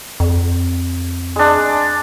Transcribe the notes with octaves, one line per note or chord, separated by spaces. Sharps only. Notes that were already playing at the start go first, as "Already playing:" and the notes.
F2
G#3 D4